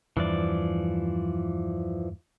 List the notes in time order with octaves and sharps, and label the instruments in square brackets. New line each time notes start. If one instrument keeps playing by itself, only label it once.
[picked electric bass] E2 G2 [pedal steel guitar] E3 F3 D5